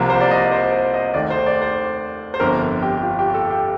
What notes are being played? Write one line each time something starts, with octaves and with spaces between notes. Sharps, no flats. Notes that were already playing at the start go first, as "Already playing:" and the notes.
Already playing: C2 C3 F3 A#3
C5
D5
D#5
C5
C5
D#5
D#2 D#3 A3 D5
C5
D5
C5
C5
G1 F2 D3 A#4
G4
G4
F4
G4
G4
A4
G4